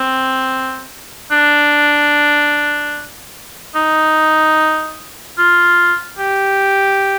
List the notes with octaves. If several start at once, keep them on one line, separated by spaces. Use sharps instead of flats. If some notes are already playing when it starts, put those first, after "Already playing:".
Already playing: C4
D4
D#4
F4
G4